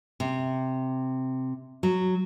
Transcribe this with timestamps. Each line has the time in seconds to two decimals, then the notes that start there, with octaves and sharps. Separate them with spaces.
0.20 C3
1.83 F#3